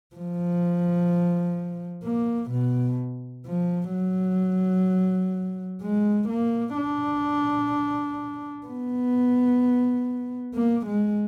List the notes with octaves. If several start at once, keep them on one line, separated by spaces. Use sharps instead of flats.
F3
A#3
B2
F3
F#3
G#3
A#3
D4
B3
A#3
G#3